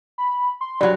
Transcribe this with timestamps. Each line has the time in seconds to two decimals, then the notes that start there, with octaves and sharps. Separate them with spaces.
0.18 B5
0.61 C6
0.81 G2 F#3 D5